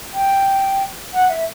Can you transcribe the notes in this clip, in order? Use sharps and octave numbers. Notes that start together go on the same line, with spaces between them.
G5
F#5
E5